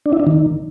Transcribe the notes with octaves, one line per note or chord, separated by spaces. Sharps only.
D4
E4
D4
D#3